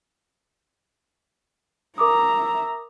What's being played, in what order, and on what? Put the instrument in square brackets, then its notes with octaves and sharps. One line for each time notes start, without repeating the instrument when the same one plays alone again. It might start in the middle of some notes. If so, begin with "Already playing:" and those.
[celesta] A#4 D6 D#6 [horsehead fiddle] E5 A#5